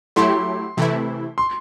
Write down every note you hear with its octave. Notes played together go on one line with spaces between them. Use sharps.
F#3 A3 E4 G4 C6
C3 E3 A3 E4
C6